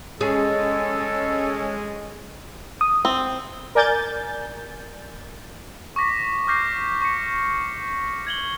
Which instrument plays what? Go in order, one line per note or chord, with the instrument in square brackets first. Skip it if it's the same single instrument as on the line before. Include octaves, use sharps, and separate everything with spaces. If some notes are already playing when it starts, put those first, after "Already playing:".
[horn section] G#3 [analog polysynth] C#4 [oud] G#4 [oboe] A4
[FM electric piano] D#6
[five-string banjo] C4
[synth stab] A#4 D5 G#5 G6 A6
[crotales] C#6 D6 A#6 B6
D6 F6 G6 A#6 C7
C#6 C#7
G#6 F#7 G7